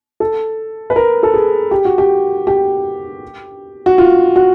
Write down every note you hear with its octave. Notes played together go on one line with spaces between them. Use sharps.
A4
B4
A#4
A4
G#4
G4
F#4
G4
G4
F#4
F4
F#4